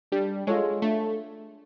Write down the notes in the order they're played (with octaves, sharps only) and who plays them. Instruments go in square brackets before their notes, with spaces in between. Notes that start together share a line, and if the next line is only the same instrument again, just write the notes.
[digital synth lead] G3 [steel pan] D4
[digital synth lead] G#3 [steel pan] F4 A4 C#5
[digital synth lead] A3 [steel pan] D4